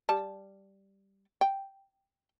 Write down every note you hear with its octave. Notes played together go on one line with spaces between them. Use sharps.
G3 A5
G5